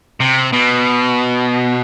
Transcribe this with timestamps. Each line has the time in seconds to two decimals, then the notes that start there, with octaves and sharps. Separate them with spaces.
0.20 C3
0.53 B2